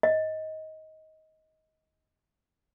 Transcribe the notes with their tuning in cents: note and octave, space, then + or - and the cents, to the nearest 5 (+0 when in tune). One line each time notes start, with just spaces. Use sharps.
D#5 +20